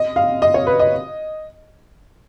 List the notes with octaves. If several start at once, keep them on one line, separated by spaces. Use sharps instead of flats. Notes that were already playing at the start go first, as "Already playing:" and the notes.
Already playing: D#5
F5
D#5
C#5
B4
D#5